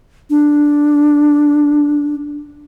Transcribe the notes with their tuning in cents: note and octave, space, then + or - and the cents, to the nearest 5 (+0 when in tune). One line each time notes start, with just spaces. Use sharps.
D4 +0